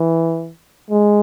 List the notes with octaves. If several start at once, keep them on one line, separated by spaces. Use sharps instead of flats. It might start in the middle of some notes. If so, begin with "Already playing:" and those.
Already playing: E3
G#3